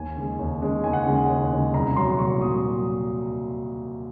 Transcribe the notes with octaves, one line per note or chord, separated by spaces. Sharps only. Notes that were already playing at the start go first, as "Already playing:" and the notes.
Already playing: D#2 G#5
C#3 G#3
D#2
C#3 G#3
D#2 G#5
F#5
C#3 G#3 G#5
D#2
C#3 G#3
C2 A#5
A#2 F#3 C6
C2 C#6
A#2 F#3 D#6